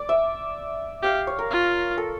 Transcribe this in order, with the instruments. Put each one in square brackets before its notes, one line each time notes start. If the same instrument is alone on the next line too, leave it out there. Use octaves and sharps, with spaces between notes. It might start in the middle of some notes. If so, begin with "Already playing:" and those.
Already playing: [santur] D5
E5
[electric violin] G4 [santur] F5
[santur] C#5
A#4
[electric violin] F4
[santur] A4